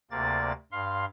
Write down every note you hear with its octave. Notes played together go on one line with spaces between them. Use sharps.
D2 C3 A#3 D5 A6
G2 F5 C6